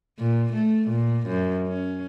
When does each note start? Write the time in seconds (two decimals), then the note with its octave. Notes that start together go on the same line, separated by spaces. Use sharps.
0.19 A#2
0.54 A3
0.89 A#2
1.27 F#2
1.67 C#4